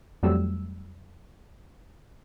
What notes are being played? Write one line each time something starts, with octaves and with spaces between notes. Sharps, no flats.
F2 F#3 G3 A3 E6